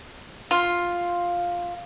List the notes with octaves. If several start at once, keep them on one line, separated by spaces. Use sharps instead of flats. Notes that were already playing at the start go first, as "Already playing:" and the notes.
F4